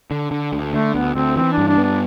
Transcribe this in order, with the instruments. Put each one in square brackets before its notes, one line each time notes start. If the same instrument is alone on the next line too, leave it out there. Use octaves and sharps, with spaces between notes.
[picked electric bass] D3
D3
D2
[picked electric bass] D3 [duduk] A3
[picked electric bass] D2 [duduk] B3
[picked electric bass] D2 [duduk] C4
[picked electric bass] E3 [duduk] C4
[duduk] D4
[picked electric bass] G2
[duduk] D4
[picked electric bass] B3
[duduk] D4